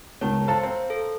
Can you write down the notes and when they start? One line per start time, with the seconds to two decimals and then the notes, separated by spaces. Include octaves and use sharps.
0.21 C#2 D#3 G#3 B3 C#5 A5
0.48 A4 C5 F5 A5 A#5
0.63 C4
0.90 A4